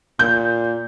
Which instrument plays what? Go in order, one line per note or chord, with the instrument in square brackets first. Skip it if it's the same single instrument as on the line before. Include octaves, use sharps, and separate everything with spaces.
[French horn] A#2 [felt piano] G6